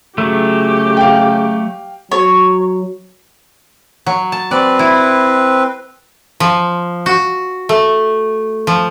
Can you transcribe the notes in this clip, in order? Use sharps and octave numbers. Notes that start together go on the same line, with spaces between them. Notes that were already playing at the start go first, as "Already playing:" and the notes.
C#3 F#3 A3 G4
F5 G5
F#3 C#5
F#3
A5
C4 B4 D5
E4
F3
F#4
A3
F3